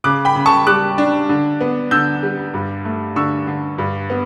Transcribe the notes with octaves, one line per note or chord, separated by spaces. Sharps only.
C#3 D6 F#6
G5 B5
C#3
A5 C#6
G3 D6 F#6
D4
D3
B3
D3 E6 G6
G3
G2
A3
D3 C#6 E6
D3
G2
B3